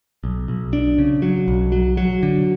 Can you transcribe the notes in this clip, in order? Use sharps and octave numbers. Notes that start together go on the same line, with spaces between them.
B1
B1
D4
C#3
F#3
B1
F#3
F#3
D3